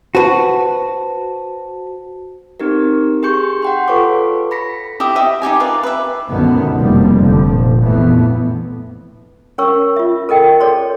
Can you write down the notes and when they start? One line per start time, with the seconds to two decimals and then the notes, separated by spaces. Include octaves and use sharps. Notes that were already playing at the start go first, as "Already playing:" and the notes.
0.15 F#4 B4 C5 A5
2.60 C4 D#4 G4 A#4
3.23 G4 G#4 C6 C#6 G6 C#7
3.62 F#5 G5 C6
3.88 F4 A4 B4 C#5 C#6 D6
4.51 B5 A#6 B6 C#7
5.00 E4 G4 E5 D#6
5.15 G4 D#5 E5 F#5
5.42 D#4 F#4 G4 G#5
5.60 F4 A#4 B4 D5
5.83 B4 E5
6.30 C#2 F#2 B2 D3 D#3 B3
6.77 F1 F3 G3 A#3
7.17 F1 D3 F3
7.48 A#2
7.82 A#1 F2 A2 E3 B3
9.58 C#4 A#4 C#5 C#6 E6
9.96 F4 E5
10.29 A4 A#4 D#5 G5
10.60 G#4 A4 C#5 D5 C6